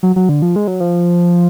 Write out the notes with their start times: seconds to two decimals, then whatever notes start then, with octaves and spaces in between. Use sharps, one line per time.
0.03 F#3
0.16 F#3
0.29 D3
0.42 F3
0.56 G#3
0.67 F#3
0.80 F3